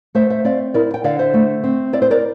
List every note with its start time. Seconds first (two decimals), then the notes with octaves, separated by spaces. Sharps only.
0.15 A3 C5 E5
0.30 C5 E5
0.44 C4 D5 F5
0.74 E4 A#4 D5
0.94 G5
1.04 D3 D5 F5
1.19 C5 E5
1.34 A3
1.64 C4
1.93 E4 D5
2.02 C5
2.11 A#4 D5